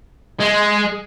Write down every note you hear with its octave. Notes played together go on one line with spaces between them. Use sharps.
G#3